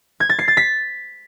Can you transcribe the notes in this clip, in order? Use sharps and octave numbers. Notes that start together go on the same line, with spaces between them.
G#6
A6
C7
A6
B6